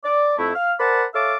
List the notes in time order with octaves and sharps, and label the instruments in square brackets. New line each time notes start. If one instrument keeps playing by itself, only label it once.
[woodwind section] D5
F2 A3 E4
F5 F6
A#4 C5 D5 F#5 A5 B5
A4 C#5 E5 F5 A5 D6